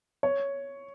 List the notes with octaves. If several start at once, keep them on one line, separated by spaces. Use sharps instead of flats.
C#5